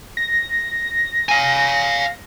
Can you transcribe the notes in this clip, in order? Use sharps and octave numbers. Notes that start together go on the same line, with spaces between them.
A#6
F5 G#5